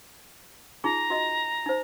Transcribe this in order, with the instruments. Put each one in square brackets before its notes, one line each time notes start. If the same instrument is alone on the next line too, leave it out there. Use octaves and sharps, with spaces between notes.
[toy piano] D#4 F4 G#4 [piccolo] A#5
[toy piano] F#4 D#5
D#4 C5